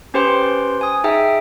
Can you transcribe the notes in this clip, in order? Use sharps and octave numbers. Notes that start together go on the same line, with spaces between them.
C#4 G4 B4 C5 G5 C6
G#5 D#6
D#4 G#4 E5 G5 E6